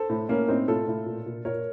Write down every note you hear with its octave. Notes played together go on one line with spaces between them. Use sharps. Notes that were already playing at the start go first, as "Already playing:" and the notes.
Already playing: A4 C5
A2
A2 A#3 C#4
A2 C4 D#4
A2 F4 A4
A2
A#2
A#2
A#2 A#4 C#5